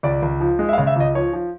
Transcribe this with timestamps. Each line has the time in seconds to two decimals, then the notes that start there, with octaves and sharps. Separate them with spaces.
0.03 C#2 D5
0.22 C#2
0.40 F3
0.59 G#3
0.69 E5
0.73 F5
0.78 C#3
0.87 E5
0.96 C#2 D#5
1.15 F3 C#5
1.33 F3